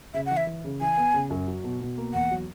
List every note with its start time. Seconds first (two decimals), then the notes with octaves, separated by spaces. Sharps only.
0.14 C#3 E5
0.26 F#5
0.31 E3
0.37 E5
0.47 E3
0.65 C#3
0.81 E3 G#5
0.97 B3
1.14 C#3
1.30 F#2
1.48 F#3
1.64 B2
1.81 B2
1.97 A#3
2.14 E2 F#5
2.31 F#3